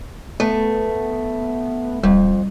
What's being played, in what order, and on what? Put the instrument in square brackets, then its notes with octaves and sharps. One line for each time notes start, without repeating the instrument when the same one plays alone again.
[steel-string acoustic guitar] A3 [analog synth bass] B3
[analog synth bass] D1 [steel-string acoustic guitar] F2 [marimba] G3